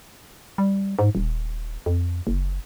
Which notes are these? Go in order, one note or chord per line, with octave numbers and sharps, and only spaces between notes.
G3
G#2
D#1
F2
F#1